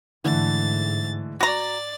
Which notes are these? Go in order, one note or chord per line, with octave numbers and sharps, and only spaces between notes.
G#2 D3 E3 A3 A6
F#4 D5 A#5 A6